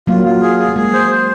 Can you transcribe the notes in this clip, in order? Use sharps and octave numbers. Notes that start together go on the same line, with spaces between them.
F#3 A#3 F4
F4
G#4
G#4
A#3
G#3 G#4
C5
C5